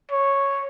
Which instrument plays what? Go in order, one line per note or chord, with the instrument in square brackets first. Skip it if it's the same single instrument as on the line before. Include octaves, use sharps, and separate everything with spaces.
[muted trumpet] C#5